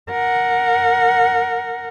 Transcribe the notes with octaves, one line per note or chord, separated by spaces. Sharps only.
A#4 F#5